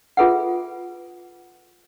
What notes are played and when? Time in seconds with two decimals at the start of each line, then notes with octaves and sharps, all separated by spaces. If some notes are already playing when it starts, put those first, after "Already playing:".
0.17 F4 G#4 A4 B4 E5 F#5